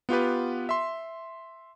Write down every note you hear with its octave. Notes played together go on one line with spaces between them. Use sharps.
B3 F4 G4 B4
E5 C6